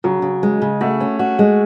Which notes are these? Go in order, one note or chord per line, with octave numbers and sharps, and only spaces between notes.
C#3 F#3
C#3
G#3
C#3
A3 F#4
C#4
F#4
G#3